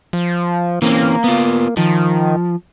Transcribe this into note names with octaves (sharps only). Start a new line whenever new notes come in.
F3
E3 A#3 C4 C#4
B3 F4
D#3 F3